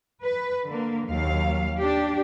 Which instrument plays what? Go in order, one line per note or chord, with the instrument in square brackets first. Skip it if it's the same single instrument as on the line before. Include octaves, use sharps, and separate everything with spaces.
[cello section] B4
D3 A#3
D#2 F#3 F5
D4 G4